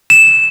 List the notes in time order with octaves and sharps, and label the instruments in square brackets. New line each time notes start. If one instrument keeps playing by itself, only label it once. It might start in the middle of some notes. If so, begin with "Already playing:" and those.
[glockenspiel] E7